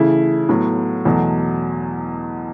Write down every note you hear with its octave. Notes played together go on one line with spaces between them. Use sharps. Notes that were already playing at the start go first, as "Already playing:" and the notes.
Already playing: C#3 E3 A3 E4 G#4
A2 F#3 B3
E2 B2 F#3 A3